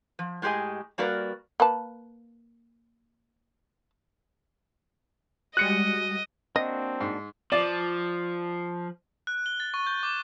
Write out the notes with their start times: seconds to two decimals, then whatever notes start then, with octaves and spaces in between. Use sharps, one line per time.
0.19 F3
0.42 A2 G#3 G4 G#4 D#5 G#5
0.98 G3 A#3 F#4 A#4 B4 D5
1.60 A#3 B4 A5
5.57 G3 G#3 F#4 D#5 F#6 C#7
6.56 A#3 C4 D4 F#4 D#5
7.01 G#2
7.52 F3 D5
9.27 F#6
9.46 G7
9.60 A6
9.74 C#6
9.87 G6
10.03 D6